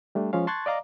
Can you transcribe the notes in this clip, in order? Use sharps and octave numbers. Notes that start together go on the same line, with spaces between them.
G3 A3 D4
F3 G#3 C#4 F5
A5 C6 C#6 F#6 G#6 A6
D5 D#5 F5 A#5 D6